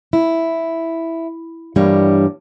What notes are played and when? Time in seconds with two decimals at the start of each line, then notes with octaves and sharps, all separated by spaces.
0.13 E4
1.76 G2 E3 G3 A#3 D4 C#5